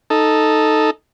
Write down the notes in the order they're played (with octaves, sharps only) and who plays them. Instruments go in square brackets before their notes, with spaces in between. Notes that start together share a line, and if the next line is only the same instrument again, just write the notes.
[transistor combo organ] D#4 A4